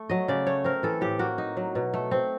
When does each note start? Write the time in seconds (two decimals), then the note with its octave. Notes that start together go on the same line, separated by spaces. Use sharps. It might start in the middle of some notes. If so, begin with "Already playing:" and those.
Already playing: A3
0.10 F#3 D#5
0.28 C#3 D5
0.47 A3 C#5
0.64 C4 A#4
0.83 E3 A4
1.01 A2 G4
1.19 A#3 F#4
1.38 D#4
1.57 F#3
1.75 B2
1.94 A3
2.11 C4